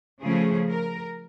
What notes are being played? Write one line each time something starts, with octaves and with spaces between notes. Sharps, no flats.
C#3 F3 A3 C#4 G#4
A#4